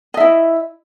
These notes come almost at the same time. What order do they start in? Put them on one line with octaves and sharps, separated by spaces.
D#5 E5 E4